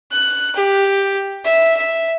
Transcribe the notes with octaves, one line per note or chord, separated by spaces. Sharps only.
F#6
G4
E5
E5